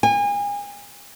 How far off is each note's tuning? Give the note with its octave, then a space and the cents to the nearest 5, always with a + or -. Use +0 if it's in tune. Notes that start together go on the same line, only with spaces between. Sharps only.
G#5 -35